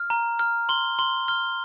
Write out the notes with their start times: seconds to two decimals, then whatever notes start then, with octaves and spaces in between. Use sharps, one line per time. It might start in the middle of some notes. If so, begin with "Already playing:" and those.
Already playing: F6
0.10 A#5
0.39 F6
0.69 C6 G7
0.99 C6 G7
1.28 F6 G7